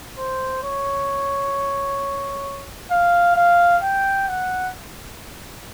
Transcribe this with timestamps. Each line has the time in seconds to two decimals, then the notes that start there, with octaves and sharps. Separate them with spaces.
0.18 C5
0.63 C#5
2.91 F5
3.36 F5
3.83 G5
4.28 F#5